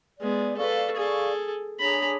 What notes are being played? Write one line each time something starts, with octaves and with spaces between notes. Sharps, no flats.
G#3 B3 D5
A4 B4 D5 F5 C#6
G#4 A4
D4 G#4 C#5 A#5 B5